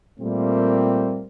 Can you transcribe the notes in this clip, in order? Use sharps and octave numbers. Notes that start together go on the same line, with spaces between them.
A#2 G3 A3 A#3 C4